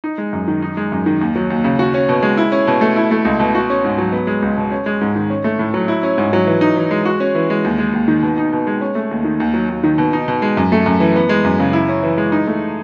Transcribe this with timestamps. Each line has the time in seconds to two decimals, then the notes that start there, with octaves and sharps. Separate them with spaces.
0.04 D#4
0.18 G#3
0.33 F#2
0.48 D#3
0.62 D#4
0.77 G#3
0.92 F#2
1.06 D#3
1.21 D#2
1.36 F#3
1.50 D#2
1.64 C#3
1.79 F#4
1.94 C#4
2.09 B2
2.22 G#3
2.37 E4
2.52 C#4
2.67 B2
2.81 A3
2.96 E4
3.11 A3
3.25 C#2
3.40 B2
3.55 F#4
3.70 C#4
3.84 G#2
3.98 F#3
4.12 B3
4.27 G#3
4.42 C#2
4.57 B2
4.71 C#4
4.86 G#3
5.01 G#2
5.15 D#3
5.30 C#4
5.44 A3
5.59 A2
5.74 F#3
5.88 E4
6.03 C#4
6.18 G#2
6.33 F#3
6.47 E3
6.61 D#4
6.77 E3
6.91 G#3
7.05 F#4
7.20 C#4
7.35 E3
7.50 G#3
7.64 D#2
7.78 G#3
7.93 D#2
8.08 D#3
8.22 B2
8.38 D#4
8.53 B2
8.67 G#3
8.81 C#4
8.95 A3
9.11 D#2
9.24 D#3
9.40 D#2
9.54 F#3
9.70 D#2
9.84 D#3
9.98 B2
10.13 D#4
10.28 B2
10.42 G#3
10.57 F#2
10.72 A3
10.86 F#2
11.00 E3
11.16 B3
11.29 G#3
11.45 F#2
11.60 C#3
11.73 E4
11.89 C#4
12.03 E3
12.18 G#3
12.32 D#4
12.47 A3